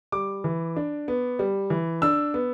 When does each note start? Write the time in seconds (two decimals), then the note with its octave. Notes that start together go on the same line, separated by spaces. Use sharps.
0.12 G3 D6
0.44 E3
0.76 D4
1.08 B3
1.39 G3
1.70 E3
2.02 D4 E6
2.34 B3